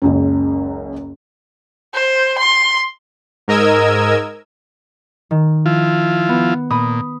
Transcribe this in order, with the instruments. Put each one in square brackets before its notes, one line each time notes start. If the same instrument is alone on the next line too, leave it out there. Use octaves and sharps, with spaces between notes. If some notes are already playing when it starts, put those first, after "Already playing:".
[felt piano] F#1 C#2 F#2
[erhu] C5
C6
[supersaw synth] G#2 A#4 D#5 E6 G#6
[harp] D#3
[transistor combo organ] F3 E4 F4
[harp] B3
[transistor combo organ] A#2 [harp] B5 D#6